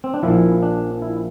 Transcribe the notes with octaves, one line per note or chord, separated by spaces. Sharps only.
C4
D4
A#1 A#2 F3 E4
D4
E4